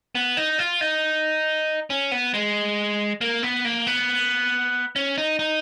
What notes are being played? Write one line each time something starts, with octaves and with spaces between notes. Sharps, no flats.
B3
D#4
F4
D#4
C#4
B3
G#3
A#3
B3
A#3
B3
C#4
D#4
D#4